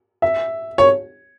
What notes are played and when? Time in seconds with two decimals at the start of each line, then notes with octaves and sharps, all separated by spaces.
0.22 E5
0.78 C#5